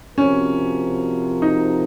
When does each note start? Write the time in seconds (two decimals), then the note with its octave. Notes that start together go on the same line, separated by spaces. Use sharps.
0.17 C3 F3 C4 C#4 F#4 A#4
1.42 D#4